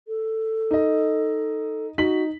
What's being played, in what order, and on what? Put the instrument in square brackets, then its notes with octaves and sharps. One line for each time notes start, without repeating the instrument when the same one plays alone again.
[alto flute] A4
[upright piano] D#4 D#5
[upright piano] D#4 B6 F#7 [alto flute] F#4